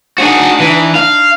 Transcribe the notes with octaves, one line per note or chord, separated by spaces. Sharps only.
D4 D#4 F#4 G#4
E3
F5